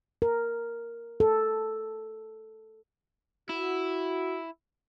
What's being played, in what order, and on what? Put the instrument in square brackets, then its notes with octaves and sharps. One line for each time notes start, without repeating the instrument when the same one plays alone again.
[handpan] A#4
A4
[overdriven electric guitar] E4 [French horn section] F#4